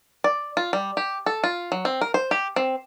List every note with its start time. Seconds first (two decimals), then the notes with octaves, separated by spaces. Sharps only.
0.24 D5
0.57 F4
0.73 G3
0.97 G4
1.26 A4
1.44 F4
1.72 F#3
1.85 C4
2.01 A#4
2.14 C5
2.31 G4
2.56 C4